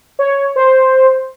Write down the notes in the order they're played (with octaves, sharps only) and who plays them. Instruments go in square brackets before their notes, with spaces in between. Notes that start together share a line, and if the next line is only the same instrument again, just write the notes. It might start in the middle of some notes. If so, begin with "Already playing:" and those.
[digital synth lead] C#5
C5